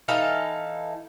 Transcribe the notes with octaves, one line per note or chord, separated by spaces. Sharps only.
E3 D#4 A4 F5